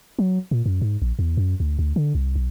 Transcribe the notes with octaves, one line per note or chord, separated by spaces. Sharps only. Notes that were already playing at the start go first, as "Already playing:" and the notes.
F#3
A#2
F#2
G#2
A#1
E2
F#2
D2
D2
D3
C2
B1